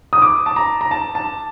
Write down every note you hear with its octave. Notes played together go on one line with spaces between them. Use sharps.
D#6
D6
A5
A#5
A#5
A5
A5